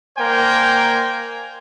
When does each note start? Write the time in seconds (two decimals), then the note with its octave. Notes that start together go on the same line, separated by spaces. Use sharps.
0.18 A#3 A#4 C5 D5 G5 G#5